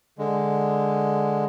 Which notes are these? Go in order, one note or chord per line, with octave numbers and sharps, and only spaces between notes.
D3 G#3